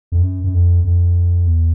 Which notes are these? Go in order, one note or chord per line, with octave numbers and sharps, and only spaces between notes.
F2
F#2
F#2
F2
F2
E2